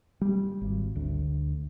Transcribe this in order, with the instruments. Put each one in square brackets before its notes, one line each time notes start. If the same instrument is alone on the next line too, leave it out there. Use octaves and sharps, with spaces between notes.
[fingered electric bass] G3
G#1
D2